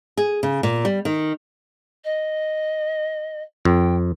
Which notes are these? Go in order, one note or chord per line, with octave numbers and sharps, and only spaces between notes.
G#4
C#3
A#2
G3
D#3
D#5
F2 G5